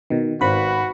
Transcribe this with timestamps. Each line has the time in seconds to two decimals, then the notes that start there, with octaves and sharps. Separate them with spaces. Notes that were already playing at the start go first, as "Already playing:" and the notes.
0.10 B2 D#3
0.41 G#1 F#4 B4 C5 B5